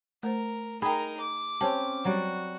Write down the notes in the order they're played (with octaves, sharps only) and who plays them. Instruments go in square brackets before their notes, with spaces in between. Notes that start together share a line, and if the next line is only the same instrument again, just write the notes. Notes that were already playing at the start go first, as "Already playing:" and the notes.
[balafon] A3 C5 [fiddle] A#4
[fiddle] D#4 A#4 [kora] G#4 [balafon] G5 B5
[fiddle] D6
[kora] C4 C#4 G4 [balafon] A5
[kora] F#3 G3 D5 [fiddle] F#4